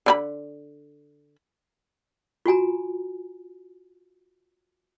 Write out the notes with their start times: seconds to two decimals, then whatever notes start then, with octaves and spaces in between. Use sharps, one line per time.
0.06 D3 F4 B5
2.46 F4 F#4 G#5 A#5